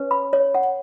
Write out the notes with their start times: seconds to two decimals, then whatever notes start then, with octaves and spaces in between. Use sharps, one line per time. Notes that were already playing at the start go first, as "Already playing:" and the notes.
Already playing: C#4 B4
0.11 B5
0.33 C#5
0.54 F#5